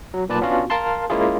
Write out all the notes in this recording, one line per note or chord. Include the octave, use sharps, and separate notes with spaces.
F#3
B1 A#2 B4 D5 A5
B3 C#4 D4 F4 F#4 F5
A#4 F5 A5 C6
G#3 A#3 C#4 E4 F4 G#4